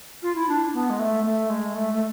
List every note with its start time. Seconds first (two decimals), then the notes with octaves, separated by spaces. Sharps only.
0.23 F4
0.35 E4
0.49 D4
0.73 B3
0.90 G#3
0.99 A3
1.24 A3
1.50 G#3
1.75 A3
1.93 A3